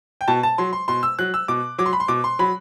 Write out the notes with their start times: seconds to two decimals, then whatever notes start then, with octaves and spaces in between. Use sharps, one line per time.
0.21 G5
0.28 B2 A5
0.43 A5
0.58 F#3 C6
0.73 C6
0.88 B2 C6
1.03 E6
1.19 F#3 F#6
1.34 E6
1.48 B2 D6
1.78 F#3 D6
1.86 C6
1.93 B5
2.00 C6
2.08 B2 D6
2.24 C6
2.39 F#3 B5